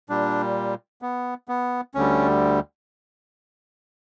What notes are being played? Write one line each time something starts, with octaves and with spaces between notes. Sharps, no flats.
A#2 G3 D4
B3
B3
D2 D3 G3 C#4